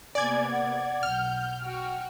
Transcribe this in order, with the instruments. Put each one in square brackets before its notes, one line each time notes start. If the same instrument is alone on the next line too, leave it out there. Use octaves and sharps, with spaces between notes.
[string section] C3 A#3 B3 [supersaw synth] D5 G#6 [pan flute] G#5
[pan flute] F#5
[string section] B1 G6 [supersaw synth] F6
[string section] F#4 G5